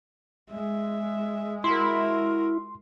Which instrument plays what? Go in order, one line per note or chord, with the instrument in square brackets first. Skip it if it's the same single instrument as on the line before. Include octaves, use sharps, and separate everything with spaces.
[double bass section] G#3 [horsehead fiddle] E5
[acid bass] E4 [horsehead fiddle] F#4 A#4 [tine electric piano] C6